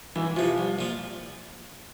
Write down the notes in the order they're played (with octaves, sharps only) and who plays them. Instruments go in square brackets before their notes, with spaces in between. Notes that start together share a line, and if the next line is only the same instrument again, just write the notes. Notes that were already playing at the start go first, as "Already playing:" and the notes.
[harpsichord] C#2 [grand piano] E3
[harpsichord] C3 E3 [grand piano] F3
[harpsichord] C2
A#2 F3